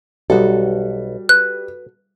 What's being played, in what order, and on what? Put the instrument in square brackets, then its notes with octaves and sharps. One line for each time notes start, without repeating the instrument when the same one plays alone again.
[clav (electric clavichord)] B1 [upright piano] G3 [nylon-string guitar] F#4 A4
[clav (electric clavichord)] B4 [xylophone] F#6